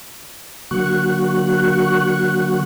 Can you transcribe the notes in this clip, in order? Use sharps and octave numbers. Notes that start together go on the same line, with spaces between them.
D3 F#3 A#3 F#4 C#6 F#6